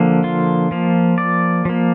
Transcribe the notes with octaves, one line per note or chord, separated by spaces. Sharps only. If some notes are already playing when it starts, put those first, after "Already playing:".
Already playing: D3 F3 A#3
F4
F3 A#3
D5
F3 A#3